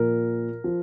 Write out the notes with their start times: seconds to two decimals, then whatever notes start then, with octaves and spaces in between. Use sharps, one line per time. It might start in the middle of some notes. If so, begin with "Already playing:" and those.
Already playing: A#2 F3 A#4
0.64 F3